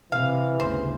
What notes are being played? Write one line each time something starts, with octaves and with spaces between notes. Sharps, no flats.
C3 E3 F5
G1 D2 C#3 C5